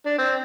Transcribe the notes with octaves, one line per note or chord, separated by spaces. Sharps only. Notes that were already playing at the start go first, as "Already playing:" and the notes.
D4
C4